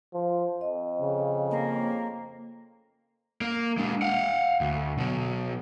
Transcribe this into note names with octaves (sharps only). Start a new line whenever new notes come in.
F3
F2 D#5
C#3
A#3
A#3 A#4
G#3 D4
F5 F#5
D2
B2 F#3